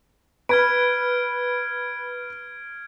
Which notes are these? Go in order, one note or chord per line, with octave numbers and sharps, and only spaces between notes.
B4 B5 F6 G#6 D7